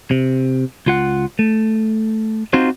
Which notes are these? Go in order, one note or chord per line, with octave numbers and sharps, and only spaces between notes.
C3
C#2 F4 F#5
A3
C4 D#4 F4 F#4 C5